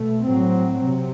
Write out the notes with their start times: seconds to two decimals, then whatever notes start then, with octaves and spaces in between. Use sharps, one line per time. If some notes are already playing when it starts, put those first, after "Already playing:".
Already playing: B2 A3
0.25 A2 F#3 C4
0.82 C3